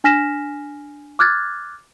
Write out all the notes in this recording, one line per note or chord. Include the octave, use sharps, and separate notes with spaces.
D4 G#5 F6 A#6 B6 E7
D6 F6 F#6 G#6 A6